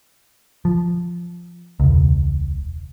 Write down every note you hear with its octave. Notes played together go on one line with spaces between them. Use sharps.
F3
E1 C#2